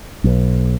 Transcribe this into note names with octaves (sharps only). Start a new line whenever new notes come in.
B1